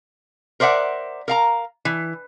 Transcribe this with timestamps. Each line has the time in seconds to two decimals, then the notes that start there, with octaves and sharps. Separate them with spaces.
0.60 A#4 C5 D5 E5 F#5
1.28 A#4 F5 A#5
1.85 E3